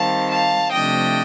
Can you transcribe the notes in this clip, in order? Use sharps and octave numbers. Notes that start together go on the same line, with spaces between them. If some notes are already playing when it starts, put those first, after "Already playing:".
Already playing: D#3 G3 C4 F5 A5
F5 A5
C3 F3 A3 D4 D#5 G5